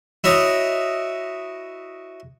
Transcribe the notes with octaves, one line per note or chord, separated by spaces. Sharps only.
E4 F#4 C#5 D#5